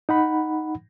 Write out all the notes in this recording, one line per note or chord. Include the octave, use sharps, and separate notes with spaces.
D#4 F#5 B5